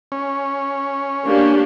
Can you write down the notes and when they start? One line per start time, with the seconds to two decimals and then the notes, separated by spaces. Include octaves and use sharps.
0.12 C#4
1.25 A#3 D4 G4